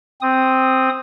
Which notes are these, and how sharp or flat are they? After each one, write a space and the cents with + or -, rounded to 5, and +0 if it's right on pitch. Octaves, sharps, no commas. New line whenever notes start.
C4 +0 D#6 +0